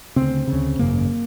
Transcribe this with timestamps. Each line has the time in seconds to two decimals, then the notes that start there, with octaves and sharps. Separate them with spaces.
0.16 D2 C#3 C4
0.47 D2 C#3
0.79 G#1 F#2 C#3 A#3